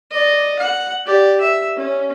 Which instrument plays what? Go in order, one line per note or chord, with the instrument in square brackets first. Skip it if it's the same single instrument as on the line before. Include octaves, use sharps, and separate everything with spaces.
[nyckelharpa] D5 D#5
F#5
G4 D5
E5
C#4